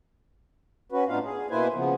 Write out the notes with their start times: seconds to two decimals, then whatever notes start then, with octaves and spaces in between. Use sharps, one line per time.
0.92 C#4 F#4 B4
1.08 A2 B3 D4 D#4 F4 F5
1.24 G#4
1.50 B2 A#3 E4 B4 C5 G#5
1.74 C#3 F3 B3